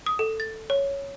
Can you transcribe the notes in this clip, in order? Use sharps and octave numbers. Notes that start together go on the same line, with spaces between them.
D#6
A4
A6
C#5